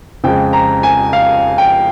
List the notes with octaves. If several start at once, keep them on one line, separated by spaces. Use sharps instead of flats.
F2 C#3 G#3 G5
A#5
G#5
F5
G5